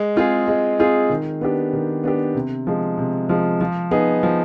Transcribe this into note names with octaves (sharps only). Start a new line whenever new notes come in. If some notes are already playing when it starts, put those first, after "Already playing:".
Already playing: G#3
C4 F4 G#4
G#3
C4 F4 G#4
D#3
B3 D4 G4
D#3
B3 D4 G4
C3
F3 G#3
C3
F3 G#3
F3
B3 D#4 G#4
F3